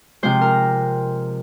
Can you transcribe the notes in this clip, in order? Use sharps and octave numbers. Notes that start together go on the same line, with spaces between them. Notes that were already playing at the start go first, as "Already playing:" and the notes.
C3 F3 G#3 C5
A#4